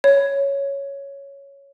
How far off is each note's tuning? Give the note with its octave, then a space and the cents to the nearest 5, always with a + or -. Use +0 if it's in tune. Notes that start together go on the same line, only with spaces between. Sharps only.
C#5 +5